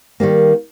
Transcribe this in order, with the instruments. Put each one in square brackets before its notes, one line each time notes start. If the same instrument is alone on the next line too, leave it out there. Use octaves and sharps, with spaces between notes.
[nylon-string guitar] D#3 G3 A#3